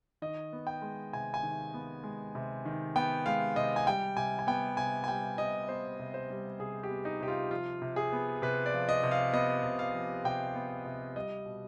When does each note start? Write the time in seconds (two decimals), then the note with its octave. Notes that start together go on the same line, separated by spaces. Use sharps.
0.22 D#3 D#5
0.53 B3
0.67 G5
0.82 G#3
1.13 C3 G#5
1.34 G#5
1.43 D#3
1.74 B3
2.04 G#3
2.35 C3
2.65 D#3
2.96 B3 G5
3.26 G#3 F5
3.56 C3 D#5
3.76 G#5
3.87 G3 G5
4.17 C3 G#5
4.39 G#5
4.47 B3 G5
4.77 C3 G#5
5.04 G#5
5.08 G3 G5
5.38 C3 D#5
5.69 B3 C5
5.99 C3
6.14 C5
6.30 G3
6.60 C3 G#4
6.83 G4
6.90 B3
7.05 D#4
7.20 C3 G4
7.28 F4
7.51 F3 F4
7.82 C3
7.96 G#4
8.12 B3
8.42 C3 B4
8.66 D5
8.73 F3
8.89 D#5
9.03 C3
9.11 F5
9.33 B3 D#5
9.63 C3
9.79 F5
9.94 F3
10.24 C3 G5
10.55 B3
10.85 C3
11.16 G3 D#5
11.46 B2